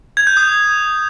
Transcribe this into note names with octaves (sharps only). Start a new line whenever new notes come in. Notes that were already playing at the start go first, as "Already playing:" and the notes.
G#6
G6
D#6